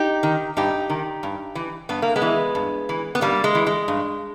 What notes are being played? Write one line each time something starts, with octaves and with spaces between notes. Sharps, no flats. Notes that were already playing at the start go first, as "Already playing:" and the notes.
Already playing: D#4 G4
D#3
G2 D#4 G4
D#3
G2
E3
G2 B3
A#3
G#3 B3
E3
G2
E3
B3
G2 G3 A#3
G#3
E3
G#3
G2